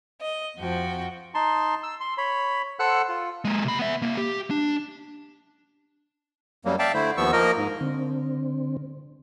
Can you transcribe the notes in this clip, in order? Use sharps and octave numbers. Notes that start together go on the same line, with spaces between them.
D#5
F2 F3 F#4 G5
D#4 A5 C6
E6
C6
C#5 B5
A4 C5 F#5 E6 F#6
F4
G#3 A#3
C3 B5
B3 E5
C2 A#3
G4
D4
F#2 F#3 G3 A#3
D5 E5 F5 G5 A5
D3 A3 E4 C5
D#2 F3 B3 C#6 E6
F3 A#3 A#4 D#5
G#2
D3 C4